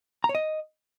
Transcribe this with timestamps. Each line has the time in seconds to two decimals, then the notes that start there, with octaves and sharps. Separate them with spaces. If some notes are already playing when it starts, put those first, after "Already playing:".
0.24 A#5
0.29 C#5
0.35 D#5